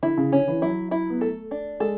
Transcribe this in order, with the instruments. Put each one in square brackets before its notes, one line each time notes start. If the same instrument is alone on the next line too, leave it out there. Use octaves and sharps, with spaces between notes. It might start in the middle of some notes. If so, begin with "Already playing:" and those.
[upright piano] D3 [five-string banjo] E4
[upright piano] C#3
[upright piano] D3 [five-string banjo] C#4
[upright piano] E3
[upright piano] F#3 [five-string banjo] E4
[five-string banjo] E4
[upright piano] B3
[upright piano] A3 [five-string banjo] A4
[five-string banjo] D4
[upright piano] G#3 [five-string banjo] A4